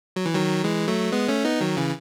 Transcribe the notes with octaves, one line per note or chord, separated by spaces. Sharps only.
F#3
E3
D#3 F#3
E3 G#3
F#3 A3
G#3 B3
A3 C#4
B3 D#4
D#3 F#3
C#3 E3